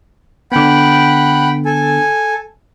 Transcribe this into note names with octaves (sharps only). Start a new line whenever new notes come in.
D3 B3 F#5 G5 B5
A4 G#5